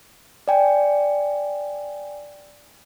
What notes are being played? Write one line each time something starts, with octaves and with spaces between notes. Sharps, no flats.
D5 G5 G#5